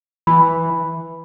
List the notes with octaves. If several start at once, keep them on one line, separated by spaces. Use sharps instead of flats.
E3 B5